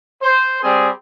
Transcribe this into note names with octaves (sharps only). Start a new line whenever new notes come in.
C5
G3 C4 G#4